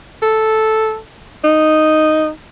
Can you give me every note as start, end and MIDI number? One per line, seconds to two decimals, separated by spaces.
0.22 0.97 69
1.44 2.29 63